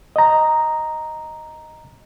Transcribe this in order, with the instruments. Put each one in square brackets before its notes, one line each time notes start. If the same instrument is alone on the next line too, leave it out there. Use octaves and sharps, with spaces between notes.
[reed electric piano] D#5 A#5